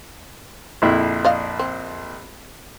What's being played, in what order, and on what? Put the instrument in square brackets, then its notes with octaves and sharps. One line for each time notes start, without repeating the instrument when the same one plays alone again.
[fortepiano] A#1 F2 E4
[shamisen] D5 D#5 F5
C4